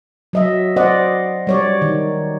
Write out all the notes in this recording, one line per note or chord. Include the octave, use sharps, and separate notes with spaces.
F#3 D#5 E5
C5 D5 D#5 F#5
G3 C#5 D5
D#3